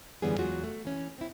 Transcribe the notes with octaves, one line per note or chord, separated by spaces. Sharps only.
F#2 D3 E3 G3 B3 G#4
E2 F#3 G#3 F4 F#4
A3
E3 C#4
C4 E4